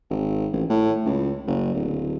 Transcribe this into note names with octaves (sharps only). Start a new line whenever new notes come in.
G#1
A1
A2
C#2
F#1
D1